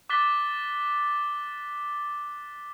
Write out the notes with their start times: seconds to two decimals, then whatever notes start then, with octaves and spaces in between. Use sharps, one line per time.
0.10 D6 F#6 A6 B6 G7